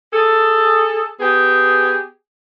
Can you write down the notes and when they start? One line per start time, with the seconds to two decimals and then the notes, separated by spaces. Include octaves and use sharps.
0.13 G#4 A4
1.20 B3 G4 G#4